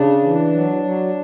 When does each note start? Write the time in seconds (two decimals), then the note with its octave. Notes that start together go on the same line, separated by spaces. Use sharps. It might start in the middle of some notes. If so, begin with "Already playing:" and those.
Already playing: C#3 D4
0.23 E3
0.52 F#3
0.84 F#3